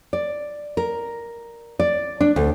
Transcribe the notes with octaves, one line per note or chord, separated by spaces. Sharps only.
D5
A#4
D5
D4
D2